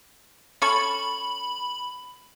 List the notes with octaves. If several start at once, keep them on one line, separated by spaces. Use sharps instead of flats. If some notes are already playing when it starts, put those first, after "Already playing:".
C#4 A4 B5 C#6